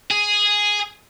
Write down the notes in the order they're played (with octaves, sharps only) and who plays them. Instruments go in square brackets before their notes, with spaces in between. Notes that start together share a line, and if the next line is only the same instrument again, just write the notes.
[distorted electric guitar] G#4